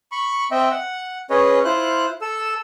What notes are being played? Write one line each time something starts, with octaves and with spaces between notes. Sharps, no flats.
B5 C#6
C4 D#5 E5 G5
F#5
C#4 G#4 B4 C#5 D#5
E4 F4 C5 F#6
A4 E6